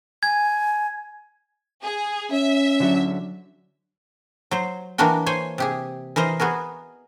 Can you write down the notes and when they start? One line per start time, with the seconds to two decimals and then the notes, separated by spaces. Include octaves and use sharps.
0.23 G#5 G#6
1.82 G#4
2.32 C#4 E5
2.80 D3 F#3
4.51 F#3 C5
4.98 E3 A#3 D4 F#4 A#4 G5
5.26 C5 C#5 G#5
5.58 C3 G4 G#4
6.16 E3 A#4 C5 D#5
6.40 B3 F#4 G#4 A#4